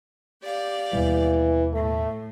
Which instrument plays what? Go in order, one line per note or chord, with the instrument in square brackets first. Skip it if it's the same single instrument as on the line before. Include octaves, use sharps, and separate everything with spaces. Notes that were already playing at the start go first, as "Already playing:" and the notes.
[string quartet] G4 D5 F5
[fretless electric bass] D#2 B2 G3 [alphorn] E3
[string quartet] A2 [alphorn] A3